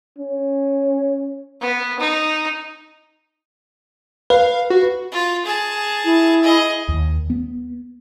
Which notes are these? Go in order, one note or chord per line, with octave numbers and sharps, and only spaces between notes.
C#4
B3
D#4
B4 F5
F#4
F4
G#4 A5
E4
G#4 D#5
D#2
B3